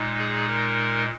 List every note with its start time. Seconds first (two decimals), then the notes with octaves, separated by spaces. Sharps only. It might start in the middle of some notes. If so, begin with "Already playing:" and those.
Already playing: A#2 G#3 D#4
0.18 G#4
0.48 A#4